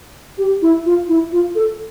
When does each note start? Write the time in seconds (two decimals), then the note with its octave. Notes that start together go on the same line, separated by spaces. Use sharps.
0.38 G4
0.62 E4
0.86 F4
1.08 E4
1.33 F4
1.55 A4